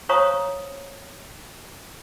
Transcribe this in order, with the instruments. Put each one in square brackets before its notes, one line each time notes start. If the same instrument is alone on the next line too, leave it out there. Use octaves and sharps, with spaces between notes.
[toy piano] C5 C#5 F5 A#5 C#6 D#6